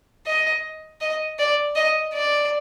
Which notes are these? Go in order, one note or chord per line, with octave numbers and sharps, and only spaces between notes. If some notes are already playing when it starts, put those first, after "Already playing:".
D#5
D#5
D5
D#5
D5